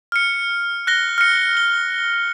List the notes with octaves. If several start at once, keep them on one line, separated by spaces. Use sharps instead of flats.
F6 C#7
F#6 A#6 G7
F6 C#7
G7